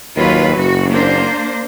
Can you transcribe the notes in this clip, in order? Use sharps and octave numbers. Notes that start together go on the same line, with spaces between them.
D#2 F#3 F4 B4
F#1 F#4
A#3 D4 C5